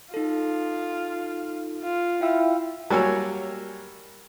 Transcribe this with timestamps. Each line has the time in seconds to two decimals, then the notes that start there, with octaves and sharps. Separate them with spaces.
0.14 D#4 F4 A4
1.83 F4
2.21 E4 F5 G5 E6
2.90 F#3 G3 A#3 C#5 G#5 E6